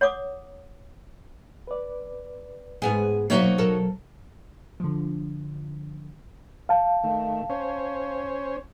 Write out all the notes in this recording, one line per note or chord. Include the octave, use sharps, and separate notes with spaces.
C#5 F#5 D6 D#6
B4 D5
G#2 B3 G#4 G#5
B2 F#3 A#3 D#4 F#4 C5 C#5 E5
A4 A#4
D3 F3
F5 A5
D#3 A3
C#4 C5 C#5